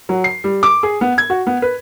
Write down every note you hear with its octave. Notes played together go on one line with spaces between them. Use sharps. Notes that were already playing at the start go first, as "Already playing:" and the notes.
F#3
C7
G3
D6
G#4
B3
G#6
F#4
B3
B4